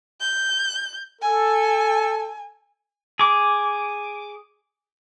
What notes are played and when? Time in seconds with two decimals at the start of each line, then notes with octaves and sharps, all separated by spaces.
0.21 G6
1.22 A4 G#5
3.19 G#4 D6